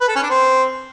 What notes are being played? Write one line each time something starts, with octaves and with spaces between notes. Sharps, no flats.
B4
A4
C#4
D4
C4